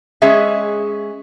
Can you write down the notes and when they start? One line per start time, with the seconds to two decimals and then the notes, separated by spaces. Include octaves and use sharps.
0.22 G#3 C#4 G#4 D#5 E5